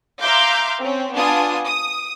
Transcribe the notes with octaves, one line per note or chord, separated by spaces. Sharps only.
E5 F5 A#5 C6 D6 G6
C4 C#4
B3 D4 F4 G#5 A5 D#6
D#6